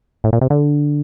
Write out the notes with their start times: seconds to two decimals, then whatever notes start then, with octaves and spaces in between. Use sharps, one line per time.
0.24 A2
0.33 A#2
0.41 C3
0.50 D3